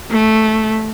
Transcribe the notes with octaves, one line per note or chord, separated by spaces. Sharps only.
A3